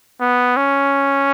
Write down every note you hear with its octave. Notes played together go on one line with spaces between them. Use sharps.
B3
C#4